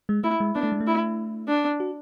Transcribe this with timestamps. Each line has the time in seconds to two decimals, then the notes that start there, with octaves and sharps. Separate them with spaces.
0.09 G#3
0.24 A3 E4
0.40 G#3
0.55 B3 D4
0.63 A3
0.72 G#3
0.81 A3
0.87 E4
1.48 D4
1.80 F#4